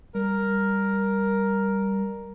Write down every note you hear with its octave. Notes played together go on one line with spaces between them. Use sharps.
G3 A#4